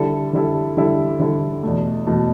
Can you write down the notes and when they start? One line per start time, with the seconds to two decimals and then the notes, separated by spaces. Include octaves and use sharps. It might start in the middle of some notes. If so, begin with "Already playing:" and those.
Already playing: D3 G3 E4 A4
0.33 D3 G3 E4 A4
0.77 D3 G3 E4 A4
1.20 D3 G3 E4 A4
1.63 E2 B2 A3
2.06 E2 B2 A3